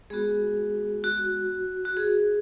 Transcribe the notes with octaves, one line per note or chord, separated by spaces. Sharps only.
G#3 B3 F#4 G#4
F#4
F#4
G#4